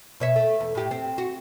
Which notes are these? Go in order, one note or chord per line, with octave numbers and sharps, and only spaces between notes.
B2 C#5 E5
A3
E2
A2 G4
C4
F#4